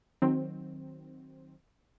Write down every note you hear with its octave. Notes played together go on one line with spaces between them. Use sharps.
D#3 F#3 C4